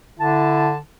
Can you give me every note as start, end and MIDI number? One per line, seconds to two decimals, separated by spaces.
0.19 0.78 50
0.19 0.71 64
0.19 0.76 81